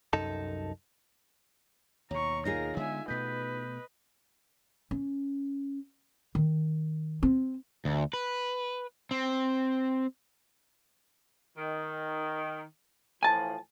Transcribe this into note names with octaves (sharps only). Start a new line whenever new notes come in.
C2 F#2 D#4 A4 A5
D#2 B2 C#5 A#5 C#6
D#4 F4 G#4 A#4 A#6
D3 G#3 B3 E5 G#5
B2 A3 B4 D#5 G6 B6
C#4
D#3
C4
D2
B4
C4
D#3
A2 E3 F3 G#5 A5